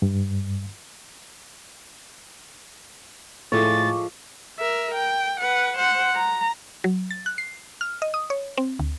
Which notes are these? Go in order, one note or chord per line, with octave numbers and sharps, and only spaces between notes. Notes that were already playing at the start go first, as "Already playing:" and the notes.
G2
A2 F3 G#3 A4 C#6 D6 A6
A#4 E5
G5
B4 F#5
C5 F#5
A#5
F#3
A6
F#6
C7
F6
D#5
D#6
C#5
C4
D2